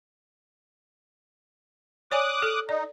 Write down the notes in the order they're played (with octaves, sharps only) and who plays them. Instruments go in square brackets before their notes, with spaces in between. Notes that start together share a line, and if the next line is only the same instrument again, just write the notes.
[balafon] C#5 D5 G#5 [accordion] D6 D#6 F#6
[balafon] A4
[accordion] D#4 [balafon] D5